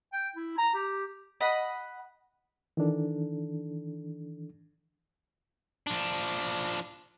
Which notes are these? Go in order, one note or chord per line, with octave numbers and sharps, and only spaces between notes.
G5
E4
A#5
G4
D#5 F#5 B5
D#3 E3 D4 A4
F3 D4